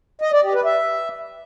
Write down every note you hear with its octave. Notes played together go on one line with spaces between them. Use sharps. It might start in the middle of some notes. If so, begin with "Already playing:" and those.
D#5
D5
G4
B4
E5